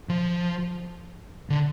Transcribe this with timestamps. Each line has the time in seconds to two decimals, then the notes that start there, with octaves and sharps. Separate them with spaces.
0.09 F3
1.50 D3